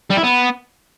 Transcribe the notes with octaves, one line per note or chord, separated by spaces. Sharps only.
G3
E4
B3